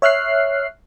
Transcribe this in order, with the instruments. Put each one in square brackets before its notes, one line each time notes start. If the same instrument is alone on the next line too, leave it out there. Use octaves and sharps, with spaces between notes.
[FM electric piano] C#5 E5 F6 F#6 C7